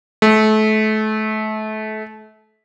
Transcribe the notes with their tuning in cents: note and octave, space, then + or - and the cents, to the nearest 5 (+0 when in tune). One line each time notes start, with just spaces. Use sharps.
A3 -30